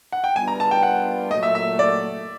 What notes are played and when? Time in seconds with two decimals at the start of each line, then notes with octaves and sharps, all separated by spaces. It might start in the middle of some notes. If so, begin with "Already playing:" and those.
0.12 F#5
0.24 G5
0.36 G3 B3 D4 F4 G#5
0.48 A#5
0.60 A5
0.71 G5
0.83 F#5
1.31 A#2 F#3 A3 D#5
1.43 E5
1.55 E5
1.79 D5